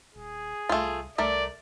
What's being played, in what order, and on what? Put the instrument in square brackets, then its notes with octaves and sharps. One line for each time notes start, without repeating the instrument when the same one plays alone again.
[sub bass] D#1 [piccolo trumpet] G#4
[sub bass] C2 [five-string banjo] A3 F4
[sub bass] C2 [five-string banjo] A3 A#4 [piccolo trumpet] D5